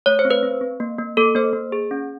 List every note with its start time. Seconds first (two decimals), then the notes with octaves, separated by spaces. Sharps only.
0.06 A3 C#5
0.19 C5
0.25 C4
0.31 B4
0.43 C4
0.61 C4
0.80 A#3
0.99 A#3
1.17 A#3 A4
1.35 A#3 C5
1.53 A#3
1.72 G#4
1.91 C#4